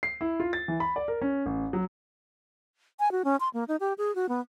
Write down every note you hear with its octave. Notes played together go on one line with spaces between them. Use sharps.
C7
E4
F4
A6
E3
B5
D5
A#4
C#4
A1
F#3
G#5
F#4
C#4
C6
A#3
D#4
G4
G#4
F#4
B3